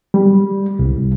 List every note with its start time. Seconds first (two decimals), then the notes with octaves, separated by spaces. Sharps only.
0.14 G3
0.79 C2